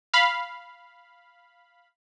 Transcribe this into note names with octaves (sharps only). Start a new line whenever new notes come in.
F5 B5